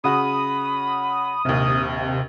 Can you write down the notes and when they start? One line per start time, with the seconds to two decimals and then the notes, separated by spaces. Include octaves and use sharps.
0.04 C#3 F#4 B5 D#6
1.45 A#1 D#2 C3 F6